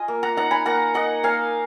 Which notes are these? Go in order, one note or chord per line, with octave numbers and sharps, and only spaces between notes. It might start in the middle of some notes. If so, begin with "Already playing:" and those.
Already playing: F4 D#5 G#5
A#3
F#5 A#5
D#4 F#5 A#5
G#5 B5
A#3 F#5 A#5
D#4 D#5 F#5
A#3 F5 G#5